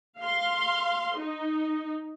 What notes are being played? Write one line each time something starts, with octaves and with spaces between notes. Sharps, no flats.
F5 C6
D#4